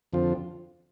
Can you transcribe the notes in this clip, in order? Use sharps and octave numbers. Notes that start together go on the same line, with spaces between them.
F2 D3 F3 C4 F4